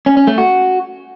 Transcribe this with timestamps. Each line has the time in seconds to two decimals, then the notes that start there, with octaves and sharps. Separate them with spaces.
0.06 C#4
0.17 C#4
0.27 A3
0.38 F#4